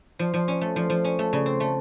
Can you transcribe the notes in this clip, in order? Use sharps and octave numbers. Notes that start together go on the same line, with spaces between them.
F3
F3
C#4
A3
F3
F3
C#4
A3
C#3
C4
A3